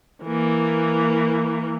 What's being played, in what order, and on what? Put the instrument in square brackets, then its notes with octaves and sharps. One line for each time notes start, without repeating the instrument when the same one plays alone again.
[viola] E3 A#3